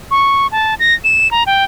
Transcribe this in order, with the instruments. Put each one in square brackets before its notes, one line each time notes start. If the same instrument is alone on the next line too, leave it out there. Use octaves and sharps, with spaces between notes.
[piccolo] C#6
A5
A#6
E7
A#5
G5